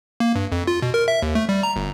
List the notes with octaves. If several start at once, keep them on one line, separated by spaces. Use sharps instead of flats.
A#3
G2
F2
F4
B2
A#4
E5
D#2
A3
G3
A#5
G1